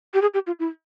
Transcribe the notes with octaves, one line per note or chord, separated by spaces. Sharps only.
G4
G#4
G4
F4
E4